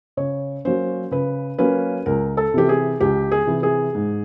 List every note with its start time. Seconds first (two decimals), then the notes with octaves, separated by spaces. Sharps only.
0.17 C#3 C#5
0.65 F#3 A#3 C#4 C5
1.11 C#3 B4
1.59 F#3 A#3 C#4 B4
2.06 C#2 A#4
2.37 A4
2.54 C3 E3 G4
2.69 G#4
3.00 C#2 G4
3.32 G#4
3.47 C3 E3
3.63 G#4
3.95 G#2